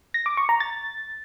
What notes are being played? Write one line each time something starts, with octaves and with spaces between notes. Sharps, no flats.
A#6
D6
C#6
A#5
A6